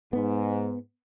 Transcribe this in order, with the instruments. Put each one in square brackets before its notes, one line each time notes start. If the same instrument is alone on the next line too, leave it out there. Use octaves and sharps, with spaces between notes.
[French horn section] G#2 [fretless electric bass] B3